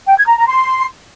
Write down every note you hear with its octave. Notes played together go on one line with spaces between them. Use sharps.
G5
G#6
A#5
A#5
C6